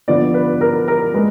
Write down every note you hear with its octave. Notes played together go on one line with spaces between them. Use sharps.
D3 F3 B3 D5
B4
A#4
A#4
G#3 B4